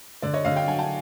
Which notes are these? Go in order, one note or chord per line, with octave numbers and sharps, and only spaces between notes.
D3 D5
C#5 D#5
D3 D#5 F5
F5 G5
F#3 F#5 G#5
G5 A5